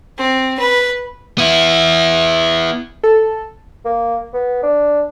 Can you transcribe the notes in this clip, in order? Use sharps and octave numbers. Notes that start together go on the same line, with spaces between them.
C4
B4
B3 E4
A4
A#3
B3
D4